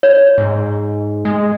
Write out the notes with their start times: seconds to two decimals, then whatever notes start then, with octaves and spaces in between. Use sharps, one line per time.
0.03 C#5
0.38 G#2
1.25 G#3